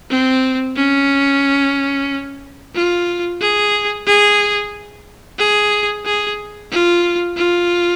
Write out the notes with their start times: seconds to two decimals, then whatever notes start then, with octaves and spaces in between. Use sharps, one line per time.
0.10 C4
0.76 C#4
2.75 F4
3.41 G#4
4.07 G#4
5.39 G#4
6.06 G#4
6.71 F4
7.37 F4